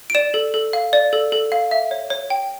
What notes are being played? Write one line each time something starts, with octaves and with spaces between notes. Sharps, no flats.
D7
D5 E7
A4
A4
F5
D5
A4
A4
F5
E5
C#5
C#5
G5